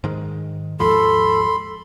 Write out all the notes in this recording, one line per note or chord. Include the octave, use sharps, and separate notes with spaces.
G#2 D#3 G#3
D#2 G#2 F3 A4 B5 C6